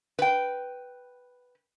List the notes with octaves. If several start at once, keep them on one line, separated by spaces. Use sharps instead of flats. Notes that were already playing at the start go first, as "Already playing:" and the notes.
B4 G5